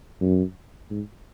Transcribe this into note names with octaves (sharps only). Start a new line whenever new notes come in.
F#2
G#2